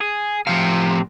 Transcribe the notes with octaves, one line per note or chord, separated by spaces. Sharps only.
G#4
A2 C3 F3 F5